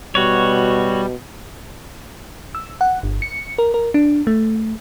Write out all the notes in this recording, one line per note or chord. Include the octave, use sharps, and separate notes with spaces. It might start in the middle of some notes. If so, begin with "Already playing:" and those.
B2 G3 F#4 C#5
E6
F#5
G1
C#7
A#4
A#4
D4
A3